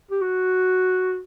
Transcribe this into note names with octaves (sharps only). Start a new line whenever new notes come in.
G4
F#4